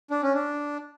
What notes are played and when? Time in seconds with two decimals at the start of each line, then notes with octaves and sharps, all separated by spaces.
0.11 D4
0.22 C#4
0.34 D4